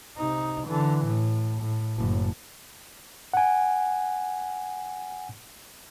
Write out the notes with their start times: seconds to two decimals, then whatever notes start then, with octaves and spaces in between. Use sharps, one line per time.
0.17 C3 D#4
0.67 D3 E3
1.06 A2
1.62 A2
1.97 F#1 A2
3.34 F#5 G#5